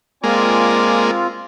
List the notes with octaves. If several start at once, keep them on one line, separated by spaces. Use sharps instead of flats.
G#3 A#3 C4 F4 D5 G#5 D6